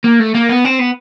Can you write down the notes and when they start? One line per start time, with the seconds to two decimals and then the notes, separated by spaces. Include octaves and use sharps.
0.04 A#3
0.20 A3
0.35 A#3
0.49 B3
0.65 C4
0.79 B3